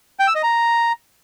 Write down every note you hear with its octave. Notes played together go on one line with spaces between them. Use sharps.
G5
E6
D#5
A#5